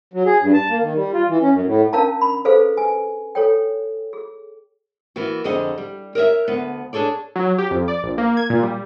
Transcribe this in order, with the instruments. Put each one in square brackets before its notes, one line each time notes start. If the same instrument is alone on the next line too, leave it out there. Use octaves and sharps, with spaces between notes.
[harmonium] F#3
G#4
G2
A5
A#3
D#3
G3
F4
E3
C#4
F#2
A2
[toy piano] C#4 D4 A#4 F5 A5 A#5
B5
G#4 A4 B4 C5 F5
G#5
A4 C#5 G5
G#4
[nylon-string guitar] E3 A#3 B3 F#4
F2 D3 G#4 D#5 F#5
G3
A#4 C#5 D#5 E5
D2 B3
D4 G#4 A4 C#5 D5
[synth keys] F#3
G4
F2
D5
A#1
A#3
G#6
A#2
G3